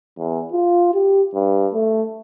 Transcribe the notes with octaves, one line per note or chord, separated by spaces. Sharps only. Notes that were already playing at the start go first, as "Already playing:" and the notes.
E2
F4
G4
G2
A3